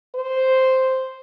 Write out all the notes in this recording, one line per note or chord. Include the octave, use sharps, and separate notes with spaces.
C5